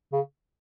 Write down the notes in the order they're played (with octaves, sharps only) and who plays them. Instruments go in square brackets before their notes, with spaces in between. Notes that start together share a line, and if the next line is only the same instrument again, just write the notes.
[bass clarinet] C#3